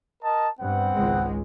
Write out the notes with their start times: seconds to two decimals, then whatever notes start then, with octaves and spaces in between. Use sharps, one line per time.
0.23 A#4 D#5 A5
0.60 G2 B3 C4 F#5
0.95 G#1 C#2 G#3